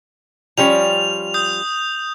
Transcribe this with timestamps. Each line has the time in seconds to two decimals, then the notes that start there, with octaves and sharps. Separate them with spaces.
0.58 F3 G3 C#4 F7
1.34 D#6 G6